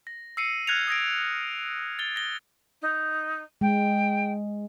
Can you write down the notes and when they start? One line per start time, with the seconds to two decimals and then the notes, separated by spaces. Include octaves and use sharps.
0.07 A#6
0.37 E6 C7 C#7 D#7
0.67 F6 F#6 G#6 A#6 C#7 F7
0.87 D#6 G#6 A#6 D7
1.99 A6 G7
2.16 A#6 G7
2.81 D#4
3.61 G#3 G5